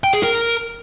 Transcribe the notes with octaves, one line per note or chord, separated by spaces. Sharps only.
G5
G#4
A#4